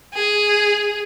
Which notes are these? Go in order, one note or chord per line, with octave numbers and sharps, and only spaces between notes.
G#4